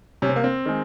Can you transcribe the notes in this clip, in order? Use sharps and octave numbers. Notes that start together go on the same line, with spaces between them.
C3 C#4
C4
A#3
C4
D#3 G#3